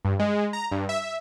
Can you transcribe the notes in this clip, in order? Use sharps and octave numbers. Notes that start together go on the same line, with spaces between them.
G2
G#3
A#5
G2
E5
E5